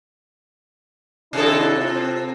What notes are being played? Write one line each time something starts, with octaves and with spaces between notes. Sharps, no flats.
C3 D#3 D4 E4 A4
C4 F4